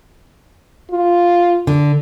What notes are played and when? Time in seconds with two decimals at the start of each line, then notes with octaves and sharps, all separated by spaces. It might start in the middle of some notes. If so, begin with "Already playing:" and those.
0.91 F4
1.67 D3